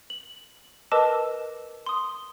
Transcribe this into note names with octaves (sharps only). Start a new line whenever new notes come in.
F#7
A#4 B4 D#5 A5 D6 E6
C6 D#6